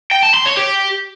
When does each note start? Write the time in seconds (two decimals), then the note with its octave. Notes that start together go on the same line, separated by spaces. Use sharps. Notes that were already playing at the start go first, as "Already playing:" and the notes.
0.11 G5
0.23 A5
0.34 C6
0.46 C#5
0.57 G4